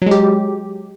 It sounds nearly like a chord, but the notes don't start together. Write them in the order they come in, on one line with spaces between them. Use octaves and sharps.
F#3 G#3 G4